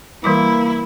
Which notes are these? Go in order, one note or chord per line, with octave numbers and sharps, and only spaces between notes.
E3 G3 A#3 E4 D6